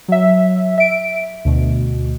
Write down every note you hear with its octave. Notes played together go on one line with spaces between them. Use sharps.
F#3 E5
E5 D7
D2 B2